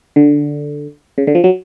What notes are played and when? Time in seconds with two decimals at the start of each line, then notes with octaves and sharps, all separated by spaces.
0.16 D3
1.18 C#3
1.27 D3
1.35 F3
1.44 F#3